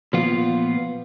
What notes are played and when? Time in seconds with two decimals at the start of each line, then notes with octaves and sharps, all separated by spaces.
0.13 A#2 F3 B3 F4